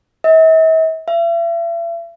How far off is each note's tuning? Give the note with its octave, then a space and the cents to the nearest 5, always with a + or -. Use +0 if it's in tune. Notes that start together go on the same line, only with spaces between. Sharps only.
E5 -45
E5 +40